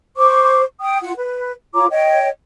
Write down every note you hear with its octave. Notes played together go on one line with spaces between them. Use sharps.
C5 C#6 D6
G5 D#6
F4 F#5
B4
F4 C#5 A#5 D6
C#5 D#5 G5